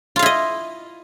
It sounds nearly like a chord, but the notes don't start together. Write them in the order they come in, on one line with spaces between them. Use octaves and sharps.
F4 F5 E4 D#5